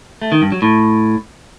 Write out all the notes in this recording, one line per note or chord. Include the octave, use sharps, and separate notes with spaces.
A3
D#3
G2
F#3
A2